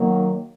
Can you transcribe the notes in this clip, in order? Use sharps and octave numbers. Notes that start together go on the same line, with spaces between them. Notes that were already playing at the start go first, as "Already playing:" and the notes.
Already playing: D#3 F#3 A#3